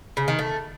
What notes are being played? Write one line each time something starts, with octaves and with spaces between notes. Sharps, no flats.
C#3
D#3
A3